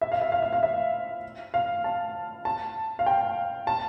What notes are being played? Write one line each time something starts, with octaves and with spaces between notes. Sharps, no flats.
E5
F5
E5
F5
E5
F5
E5
F5
A5
A5
F5
G5
A5